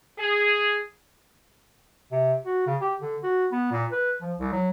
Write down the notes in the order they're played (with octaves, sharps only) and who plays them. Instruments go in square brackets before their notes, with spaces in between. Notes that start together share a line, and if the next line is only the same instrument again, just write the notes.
[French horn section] G#4
[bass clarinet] C3
F#4
C#3
G4
D3
F#4
B3
A#2
B4
F3
C2
F#3